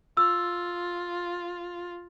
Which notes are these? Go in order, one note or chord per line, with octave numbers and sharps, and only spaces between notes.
F4 E6